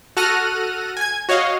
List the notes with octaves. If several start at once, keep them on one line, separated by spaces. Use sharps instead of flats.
F#4 A4 F6 F#6 A#6 D#7
G#5 G#6
F#4 C#5 D#5 F5